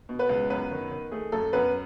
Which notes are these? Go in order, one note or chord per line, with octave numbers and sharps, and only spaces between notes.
B2
B3 B4
C#2
F#2 B3 B4
D#3
D#3
A3 G#4
F#2 A3 A4
F#2 B3 B4